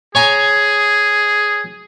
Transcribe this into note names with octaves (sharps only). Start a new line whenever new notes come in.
G#4 C#5 G#5 A#5